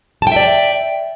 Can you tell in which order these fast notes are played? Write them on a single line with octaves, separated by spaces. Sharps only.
A5 G5 E5 D5